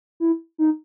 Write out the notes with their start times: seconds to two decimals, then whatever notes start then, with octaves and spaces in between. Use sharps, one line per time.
0.20 E4
0.58 D#4